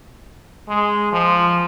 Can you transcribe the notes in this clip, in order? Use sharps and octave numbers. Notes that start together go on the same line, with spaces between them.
G#3
F3